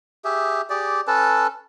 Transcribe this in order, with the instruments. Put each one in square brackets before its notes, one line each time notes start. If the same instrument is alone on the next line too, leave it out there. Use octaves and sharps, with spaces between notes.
[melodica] G4 G#4 E5
G4 G#4 D5
C#4 A4 B4 A5